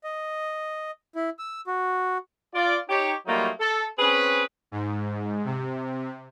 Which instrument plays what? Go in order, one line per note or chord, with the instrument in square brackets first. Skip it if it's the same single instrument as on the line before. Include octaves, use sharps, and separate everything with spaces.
[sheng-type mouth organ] D#5
E4
E6
F#4
[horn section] F4 D5
D#4 G4 C#5
F#3 G3 A3 A#3 D#4 F4
A4
C4 C#4 G#4 B4
[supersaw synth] G#2
C3